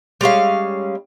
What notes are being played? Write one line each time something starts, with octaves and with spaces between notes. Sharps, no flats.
G3 G#3 C#4 F5